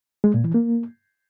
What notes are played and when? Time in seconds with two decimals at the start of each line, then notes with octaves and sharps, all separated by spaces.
0.24 G#3
0.34 A#2
0.44 E3
0.54 A#3